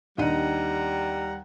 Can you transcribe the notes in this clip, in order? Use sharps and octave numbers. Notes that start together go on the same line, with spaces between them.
D#2 G3 D4 D#4 F#5 G5 A#5 D#7